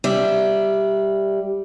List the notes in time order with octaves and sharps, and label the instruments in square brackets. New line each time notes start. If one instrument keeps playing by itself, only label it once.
[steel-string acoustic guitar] G3 E5